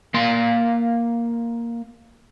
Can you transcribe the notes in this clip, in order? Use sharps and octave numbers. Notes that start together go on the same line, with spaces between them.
A#3 F5 C6